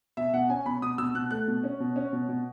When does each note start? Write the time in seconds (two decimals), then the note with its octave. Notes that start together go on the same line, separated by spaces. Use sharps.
0.17 B2 E5
0.33 B2 F#5
0.49 C#4 G#5
0.66 B2 B5
0.82 B2 D#6
0.98 B2 E6
1.15 B2 F#6
1.31 A3 F#6
1.48 B2
1.64 C#4
1.80 B2
1.96 C#4
2.13 B2
2.29 B2